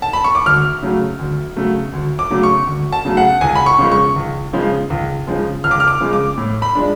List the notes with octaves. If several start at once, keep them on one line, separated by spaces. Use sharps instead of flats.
A5
B5
C#6
D6
D2 F6
C#3 F#3 A3
D2
C#3 F#3 A3
D2
D6
C#3 F#3 A3
C#6
D2
A5
C#3 F#3 A3
F#5
C#2 G#5
B5
C#6
C#3 F3 G#3
C#6
C#2
C#3 F3 G#3
C#2
C#3 F3 G#3
C#2 F6
D6
F6
D6
C#3 F3 G#3
D6
A2
B5
F3 G#3 D4